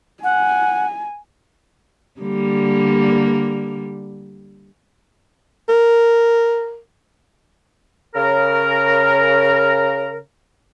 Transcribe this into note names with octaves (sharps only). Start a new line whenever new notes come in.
F#5 G#5
D3 G3 A#3
A#4
C#3 A#4